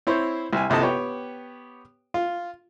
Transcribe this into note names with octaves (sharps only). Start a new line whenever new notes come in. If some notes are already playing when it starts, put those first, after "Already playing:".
C4 E4 C5 C#5
C2 G#5
A#1 C3 E4 A4 D#5 A5
B3 G4 C#5 G5
F4